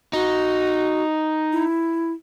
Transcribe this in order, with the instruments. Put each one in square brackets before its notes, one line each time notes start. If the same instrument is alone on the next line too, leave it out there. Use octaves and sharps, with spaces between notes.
[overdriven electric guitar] D#4 [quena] F#4
[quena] E4